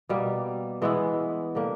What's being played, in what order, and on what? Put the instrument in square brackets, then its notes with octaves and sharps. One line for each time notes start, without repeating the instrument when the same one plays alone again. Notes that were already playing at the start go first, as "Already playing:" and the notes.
[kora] B2 G3 A#3
E3 G#3 B3 E4
D3 G3 A#3